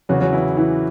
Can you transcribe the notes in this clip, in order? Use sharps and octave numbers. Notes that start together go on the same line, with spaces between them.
E2 C#3 E3 F#3 F#4
F#3 F#4
E3 E4
E3 E4